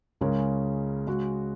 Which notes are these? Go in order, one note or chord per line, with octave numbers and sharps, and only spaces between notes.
C#2 C#3 G#3 C#4 A#4
C#3 G#3 F#4